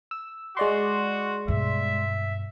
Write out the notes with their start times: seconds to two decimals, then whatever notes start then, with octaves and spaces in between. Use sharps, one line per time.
0.11 E6
0.57 G#3 F#4 D5 C6
1.48 G2 B2 E5